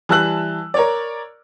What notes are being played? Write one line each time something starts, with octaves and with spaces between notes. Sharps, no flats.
E3 G3 A5 E6 F#6 F#7
A#4 C#5 D5